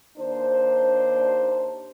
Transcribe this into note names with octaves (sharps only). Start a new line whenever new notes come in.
D#2 D4 C5